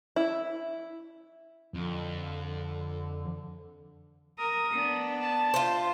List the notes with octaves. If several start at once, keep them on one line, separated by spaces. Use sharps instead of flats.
E4
F2 D3
A#4 D#6
B3 D4
A5
F4 C5